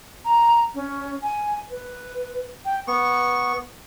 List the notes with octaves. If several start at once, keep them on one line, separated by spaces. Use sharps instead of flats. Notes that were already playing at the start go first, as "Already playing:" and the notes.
A#5
C#4
G#5
B4
G5
B3 C#6